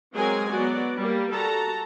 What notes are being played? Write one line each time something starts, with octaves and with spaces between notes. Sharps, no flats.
F#3 G#3 C4 G#4 A#4 G#5
F#3 B3 F#4 D5
G3 A#3
F#4 A4 A5 A#5